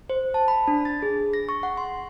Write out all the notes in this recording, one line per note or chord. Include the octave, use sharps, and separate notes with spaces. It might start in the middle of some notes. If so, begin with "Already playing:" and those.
C5
A5
B5
D4
A6
G#4
A#6
C#6
F#5
C6